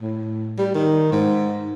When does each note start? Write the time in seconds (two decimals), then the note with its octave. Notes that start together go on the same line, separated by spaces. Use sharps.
0.01 A2
0.58 G3
0.75 D#3
1.12 G#2